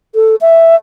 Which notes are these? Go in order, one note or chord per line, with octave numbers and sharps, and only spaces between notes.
A4
E5